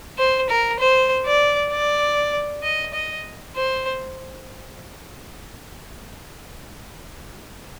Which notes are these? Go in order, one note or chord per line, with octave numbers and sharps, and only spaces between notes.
C5
A#4
C5
D5
D5
D#5
D#5
C5